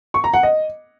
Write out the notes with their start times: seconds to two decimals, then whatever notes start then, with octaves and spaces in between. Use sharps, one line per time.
0.14 C#6
0.24 A#5
0.34 F#5
0.43 D#5